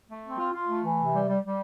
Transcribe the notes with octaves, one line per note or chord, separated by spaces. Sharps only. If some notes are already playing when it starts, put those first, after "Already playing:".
A3
C4
F4
F4
A3
E3
C3
G3
G3
G3